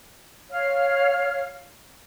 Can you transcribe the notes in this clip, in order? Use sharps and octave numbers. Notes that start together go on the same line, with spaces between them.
C#5 F5 F6